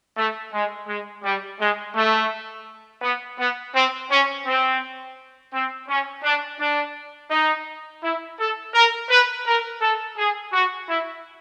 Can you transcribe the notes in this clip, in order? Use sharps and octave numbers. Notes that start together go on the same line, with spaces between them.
A3
G#3
G#3
G3
G#3
A3
B3
B3
C4
C#4
C4
C4
C#4
D4
D4
D#4
E4
A4
A#4
B4
A#4
A4
G#4
F#4
E4